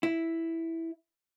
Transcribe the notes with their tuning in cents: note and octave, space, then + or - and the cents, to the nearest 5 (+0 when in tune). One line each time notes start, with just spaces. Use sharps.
E4 -5